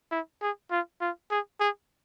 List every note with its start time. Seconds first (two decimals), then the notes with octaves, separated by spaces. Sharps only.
0.11 E4
0.42 G#4
0.71 F4
1.01 F4
1.31 G#4
1.60 G#4